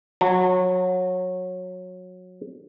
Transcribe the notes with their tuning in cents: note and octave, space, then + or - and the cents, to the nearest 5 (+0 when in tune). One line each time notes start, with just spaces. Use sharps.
F#3 -20 A5 +45